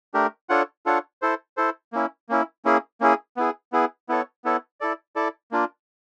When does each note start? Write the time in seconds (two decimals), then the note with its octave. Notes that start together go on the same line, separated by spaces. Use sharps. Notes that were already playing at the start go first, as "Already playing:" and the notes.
0.14 A3 D4 G4 A#4
0.49 D4 F4 A4 C#5 F#5
0.86 D4 F4 A4 C#5 F#5
1.22 E4 A4 C5
1.57 E4 A4 C5
1.93 A#3 C#4 E4
2.29 A#3 C#4 E4
2.65 A#3 C#4 E4 G#4
3.01 A#3 C#4 E4 G#4
3.37 B3 E4 G#4
3.73 B3 E4 G#4
4.09 B3 E4 A4 C#5
4.45 B3 E4 A4 C#5
4.81 E4 A4 D5
5.16 E4 A4 D5
5.51 A#3 D4 F4